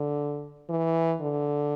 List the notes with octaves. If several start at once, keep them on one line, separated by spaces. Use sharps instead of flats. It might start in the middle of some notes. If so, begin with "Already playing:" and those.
Already playing: D3
E3
D3